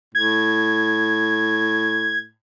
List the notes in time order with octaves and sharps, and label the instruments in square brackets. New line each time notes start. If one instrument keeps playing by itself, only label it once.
[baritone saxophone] A2 [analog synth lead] G#6